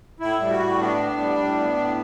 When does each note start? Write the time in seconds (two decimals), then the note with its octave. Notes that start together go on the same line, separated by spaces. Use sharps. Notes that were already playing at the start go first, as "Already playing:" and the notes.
0.20 A2 E4
0.40 G3
0.50 F#4
0.59 A2
0.79 B3 D4
0.98 A2
1.18 G3
1.38 A2
1.58 B3
1.77 A2